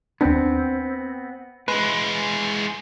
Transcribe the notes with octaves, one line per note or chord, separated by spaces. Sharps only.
D#2 B3 C4 D4
E3 G#3 B4